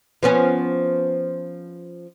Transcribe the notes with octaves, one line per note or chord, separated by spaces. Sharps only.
F3 B3 C#4